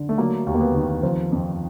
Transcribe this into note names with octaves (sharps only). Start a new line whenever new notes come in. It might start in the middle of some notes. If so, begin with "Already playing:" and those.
Already playing: D3
A3
F#3 A#3
D#2
A#3
B3
D#3
F3 C4
F2